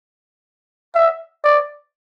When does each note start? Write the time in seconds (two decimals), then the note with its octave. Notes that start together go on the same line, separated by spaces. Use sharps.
0.95 E5
1.44 D5